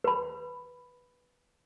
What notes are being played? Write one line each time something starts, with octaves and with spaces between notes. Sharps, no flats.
B4 B5